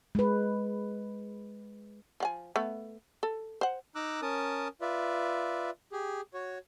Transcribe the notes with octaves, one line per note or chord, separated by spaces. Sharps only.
G#3 B4
F3 F#5 G#5
A3 B3
A4
C5 F#5
D#4 A#5 D6 E6 F#6
C#4 A#4 A5 D#6
F4 B4 D5 E5
G4 G#4
F#4 C#5